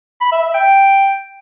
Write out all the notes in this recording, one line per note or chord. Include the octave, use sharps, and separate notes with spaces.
B5
E5
E5
G5